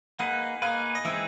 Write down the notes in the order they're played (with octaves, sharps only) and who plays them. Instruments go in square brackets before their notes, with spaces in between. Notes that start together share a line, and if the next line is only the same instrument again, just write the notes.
[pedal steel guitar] A#3 D#4 G#4 B4 [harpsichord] F#5
[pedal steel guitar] A#3 D#4 G#4 B4 [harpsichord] F5
[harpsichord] D#5
[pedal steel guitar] E3 G#3 C4 D#4 G#4 [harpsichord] E5